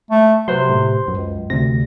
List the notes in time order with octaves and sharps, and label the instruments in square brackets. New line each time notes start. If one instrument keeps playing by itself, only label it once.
[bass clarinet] A3
[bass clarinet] C3 [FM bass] F#3 [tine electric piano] B4 C5 C6
[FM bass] A2
[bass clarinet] C#2 [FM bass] F#2
[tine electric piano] D2 A#6 [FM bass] C3